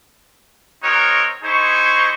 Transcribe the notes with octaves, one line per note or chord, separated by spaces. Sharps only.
C4 D#4 F#4 A#4 C#5
D#4 E4 G#4 C5 C#6